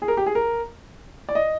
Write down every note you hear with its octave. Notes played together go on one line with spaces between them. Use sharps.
G#4
A#4
G4
G#4
A#4
D5
D#5